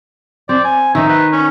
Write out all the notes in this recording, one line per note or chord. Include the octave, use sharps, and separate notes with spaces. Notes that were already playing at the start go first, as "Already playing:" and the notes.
C4 D5
G#5
D#3 D#4 E5
B4
C#4